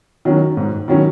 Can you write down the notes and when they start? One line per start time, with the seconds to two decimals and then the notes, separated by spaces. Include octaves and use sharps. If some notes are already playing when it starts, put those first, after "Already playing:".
0.25 D#3 F#3 C#4
0.57 G#2
0.88 D#3 F#3 C#4